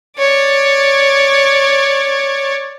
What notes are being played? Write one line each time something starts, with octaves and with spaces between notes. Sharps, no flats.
C#5 D5